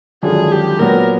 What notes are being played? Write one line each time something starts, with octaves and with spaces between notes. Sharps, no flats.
G#1 F#2 D3 F3 G#4
G4
A#2 F#3 B3 A#4